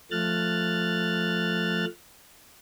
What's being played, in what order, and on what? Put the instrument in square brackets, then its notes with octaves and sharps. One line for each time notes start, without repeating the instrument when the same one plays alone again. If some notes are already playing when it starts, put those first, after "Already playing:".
[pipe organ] F3 A3 F6 F#6 A6